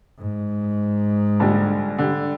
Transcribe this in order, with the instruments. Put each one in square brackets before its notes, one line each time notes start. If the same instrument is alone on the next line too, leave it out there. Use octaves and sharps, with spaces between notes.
[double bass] G#2
[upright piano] A#1 D3 G3
D3 G3